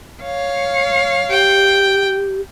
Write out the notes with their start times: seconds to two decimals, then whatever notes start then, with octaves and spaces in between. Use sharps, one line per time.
0.23 C#5 F5
1.30 G4 G5